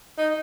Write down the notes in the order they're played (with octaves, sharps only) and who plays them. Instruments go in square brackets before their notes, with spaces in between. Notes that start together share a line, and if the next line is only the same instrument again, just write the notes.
[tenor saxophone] D#4